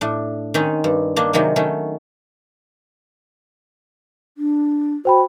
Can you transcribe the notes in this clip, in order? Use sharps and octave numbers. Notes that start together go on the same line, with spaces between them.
A2 D4
D#3 C4 C#4 D#4
G2
D#3 A#3 D4
C3 D#3 F#3 G#3 A#3
D#3 A3 C#4
D4
F#4 C5 G5 B5